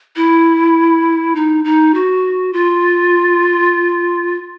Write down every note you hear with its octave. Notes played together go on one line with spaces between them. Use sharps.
E4
D#4
D#4
F#4
F4